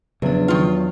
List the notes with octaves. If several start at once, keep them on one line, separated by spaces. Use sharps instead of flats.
E2 C#3 F3 F#3 D4
D#3 F4